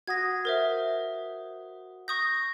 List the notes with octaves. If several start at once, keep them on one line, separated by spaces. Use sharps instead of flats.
F#4 F#5 D#6 G#6 A#6
A#4 C5 E5
C#6 D#6 G6 A#6